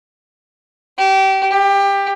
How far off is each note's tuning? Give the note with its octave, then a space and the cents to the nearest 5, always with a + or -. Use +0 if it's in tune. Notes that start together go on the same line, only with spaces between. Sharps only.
G4 -25
G4 +20